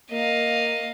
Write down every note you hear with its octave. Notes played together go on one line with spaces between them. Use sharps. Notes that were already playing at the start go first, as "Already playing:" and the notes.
A#3 D#5 F5